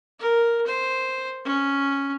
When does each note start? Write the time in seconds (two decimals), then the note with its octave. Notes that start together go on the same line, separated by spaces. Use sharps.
0.20 A#4
0.67 C5
1.45 C#4